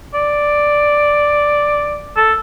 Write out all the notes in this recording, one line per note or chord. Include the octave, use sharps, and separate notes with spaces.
D5
A4